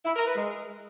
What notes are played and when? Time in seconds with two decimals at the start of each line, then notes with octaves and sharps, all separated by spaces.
0.05 E4
0.15 A#4
0.25 B4
0.35 G#3